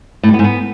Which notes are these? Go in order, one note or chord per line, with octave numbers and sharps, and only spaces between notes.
A2
G3
B3
G#2
B3